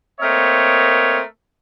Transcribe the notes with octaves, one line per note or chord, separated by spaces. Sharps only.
A3 A#3 C4 A#4 C#5 D#5